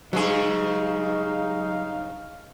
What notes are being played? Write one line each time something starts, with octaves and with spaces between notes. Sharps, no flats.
G2 C#3 F#3 G#3 D#4 G#4 F5